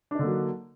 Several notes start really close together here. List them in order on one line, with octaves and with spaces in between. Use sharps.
D4 D#4 D3 A#3 F#3